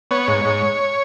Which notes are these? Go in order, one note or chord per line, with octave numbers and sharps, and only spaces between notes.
B3 C#5
G#2
G#2